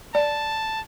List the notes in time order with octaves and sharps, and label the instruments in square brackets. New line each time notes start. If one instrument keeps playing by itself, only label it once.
[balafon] D5 [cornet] A5